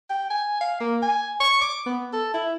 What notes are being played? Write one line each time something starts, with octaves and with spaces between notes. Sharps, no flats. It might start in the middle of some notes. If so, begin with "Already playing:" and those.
G5
G#5
F5
A#3
G#5
C#6
D6
B3
A4
E4